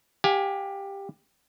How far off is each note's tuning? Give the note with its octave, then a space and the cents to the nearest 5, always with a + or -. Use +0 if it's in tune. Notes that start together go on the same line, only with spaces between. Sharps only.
G4 +10 F5 +35 G#5 +0